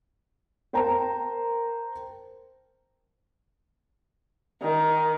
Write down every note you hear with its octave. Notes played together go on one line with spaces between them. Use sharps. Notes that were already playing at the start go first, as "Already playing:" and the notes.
A#4 C5 G5 A5 A#5
D#3